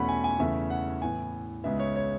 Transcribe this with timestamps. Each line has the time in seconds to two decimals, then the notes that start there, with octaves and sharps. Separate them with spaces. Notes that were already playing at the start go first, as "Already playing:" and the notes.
Already playing: E2 B2 A3 C#4 F#5 B5
0.09 G#5
0.24 G#5
0.39 E2 C#3 E3 A3 C#4 E5
0.70 F#5
1.02 A2 E3 B3 G#5
1.64 C#2 C#3 G#3 B3 E5
1.80 C#5
1.96 C#5